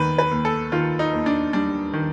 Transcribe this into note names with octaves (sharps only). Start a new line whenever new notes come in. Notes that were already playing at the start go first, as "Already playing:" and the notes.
Already playing: D#2 D#3 B4
B4
D#2
A4
D#3 F4
D#4
D#2
D4
G3 D4
D#3